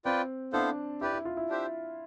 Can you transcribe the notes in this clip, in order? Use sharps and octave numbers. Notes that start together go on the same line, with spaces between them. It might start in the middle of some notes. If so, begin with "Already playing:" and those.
C4 F4 B4 D5 G5
B3 D4 E4 A4 C5 F5
E4 G4 B4 D5
E4
F4
E4
D4 G4 C5 E5